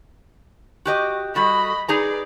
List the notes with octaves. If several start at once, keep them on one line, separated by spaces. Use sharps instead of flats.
F#4 G4 D#5
G3 F#4 A4 D#5 B5
D#4 G#4 B4 D5 A#5